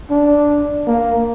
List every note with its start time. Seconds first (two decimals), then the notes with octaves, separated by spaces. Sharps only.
0.10 D4
0.87 A#3